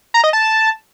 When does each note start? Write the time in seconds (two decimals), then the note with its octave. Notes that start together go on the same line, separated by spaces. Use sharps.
0.14 A#5
0.24 D#5
0.33 A5